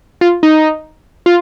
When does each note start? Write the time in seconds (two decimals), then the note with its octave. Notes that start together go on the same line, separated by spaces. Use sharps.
0.21 F4
0.43 D#4
1.26 F4